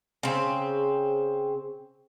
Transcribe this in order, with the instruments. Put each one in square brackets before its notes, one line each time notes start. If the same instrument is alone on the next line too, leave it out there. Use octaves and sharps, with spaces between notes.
[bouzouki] C#3 C4